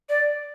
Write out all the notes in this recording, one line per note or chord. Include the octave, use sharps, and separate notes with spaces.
D5